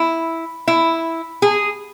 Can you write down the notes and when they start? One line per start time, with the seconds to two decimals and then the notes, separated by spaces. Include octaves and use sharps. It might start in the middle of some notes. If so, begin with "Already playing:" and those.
Already playing: E4
0.68 E4
1.42 G#4